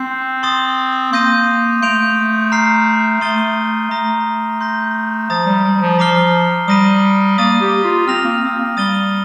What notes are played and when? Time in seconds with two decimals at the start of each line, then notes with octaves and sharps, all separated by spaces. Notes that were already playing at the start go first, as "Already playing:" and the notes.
Already playing: C4 C6 G6 C7
0.43 C6 D#6 A6
1.13 A#3 C6 D#6 G6 A#6 D#7
1.82 A3 C6 G6 D7 F7
2.52 A#5 F6 C7
3.21 A3 C6 D#6 A6 D#7 G7
3.91 A3 A#5 D#6 A#6
4.61 C6 G6 A#6
5.30 F3 A#5 D#6 A6
5.46 G3
5.64 G3
5.81 F3
5.99 F3 A#5 D6 F6 C7 G7
6.68 G3 D#6 A#6 D#7
7.38 A#3 D#6 A6 D#7
7.61 G4
7.84 F4
8.07 C4 F6 A#6 F7
8.25 A#3
8.42 C4
8.59 A#3
8.77 G3 D#6 A6 D#7 G7